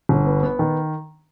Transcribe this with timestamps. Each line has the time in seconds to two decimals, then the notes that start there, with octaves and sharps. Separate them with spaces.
0.09 G1
0.26 B3
0.43 B3
0.59 D#3